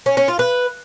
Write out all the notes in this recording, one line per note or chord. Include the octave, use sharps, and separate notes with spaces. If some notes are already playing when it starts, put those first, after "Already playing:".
C#4
C#4
F4
B4